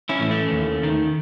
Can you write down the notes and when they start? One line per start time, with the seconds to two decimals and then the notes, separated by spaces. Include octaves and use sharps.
0.09 C#4 E4
0.20 A2 E3
0.31 A3 C#4
0.51 D#2
0.83 D#3